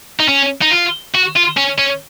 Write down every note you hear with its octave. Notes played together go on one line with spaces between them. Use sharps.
D#4
C#4
D#4
F4
F#4
F4
C#4
C#4